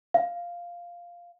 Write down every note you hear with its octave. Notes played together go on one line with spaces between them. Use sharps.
F5